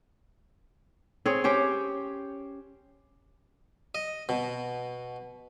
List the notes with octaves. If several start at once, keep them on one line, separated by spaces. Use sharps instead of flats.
C4 G#4 C#5
C#4 G4 C5 C#5
D#5
B2